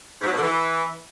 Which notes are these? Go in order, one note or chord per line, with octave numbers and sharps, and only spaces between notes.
G#2
F#3
B2
D3
E3